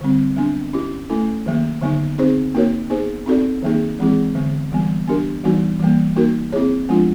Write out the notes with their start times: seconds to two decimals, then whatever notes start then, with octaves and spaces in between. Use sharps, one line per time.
0.01 D3 G3 C4
0.36 F#3 B3 D4
0.73 C#4 E4 G4
1.10 A3 C#4 E4 A4
1.46 D#3 F#3 A#3
1.81 D3 F#3 B3 D#4
2.18 C4 D#4 G#4 C5
2.55 A#3 D#4 F#4 A#4 C#5
2.90 B3 D#4 G#4 C5
3.26 C4 D#4 F#4 A4 D5
3.63 D#3 F#3 A#3 D#4 G#4
3.99 E3 G#3 C4 E4 G#4
4.35 D3 F#3 B3
4.72 E3 G3 B3
5.08 B3 D4 G4 A#4
5.44 E3 G3 B3 D#4 F#4
5.80 E3 G3 A#3
6.16 A#3 D#4 F#4 A#4
6.52 C4 E4 G#4 C#5
6.89 F3 G#3 B3 D4 F4